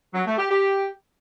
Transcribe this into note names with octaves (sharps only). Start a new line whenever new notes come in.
F#3
A3
G4
G4